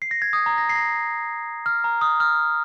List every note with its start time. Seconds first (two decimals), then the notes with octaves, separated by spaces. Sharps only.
0.02 C7
0.11 A#6
0.22 G#6
0.33 D#6
0.46 A#5
0.58 A#6
0.69 C7
0.75 A#6
1.66 F6
1.84 A#5
2.01 D#6
2.20 F6